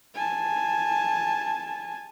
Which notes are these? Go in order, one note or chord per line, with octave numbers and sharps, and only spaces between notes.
G#5 A5